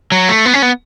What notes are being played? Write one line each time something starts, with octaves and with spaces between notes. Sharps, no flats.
F#3
A3
B3
C#4
B3